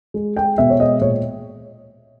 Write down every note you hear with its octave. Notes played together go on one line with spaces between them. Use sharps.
G#3
G#3 G5
B2 E5
C#5
G#3 D#5
A#2 C#5